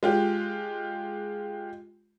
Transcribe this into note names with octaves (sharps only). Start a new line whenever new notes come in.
G#3 F4 G4